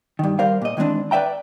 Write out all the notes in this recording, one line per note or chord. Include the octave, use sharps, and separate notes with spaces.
G2 D#3
G3 A#4 C5 F5
A#2 D#5
D#3 E3 G#3 C4 D4
B4 D5 E5 G5 A#5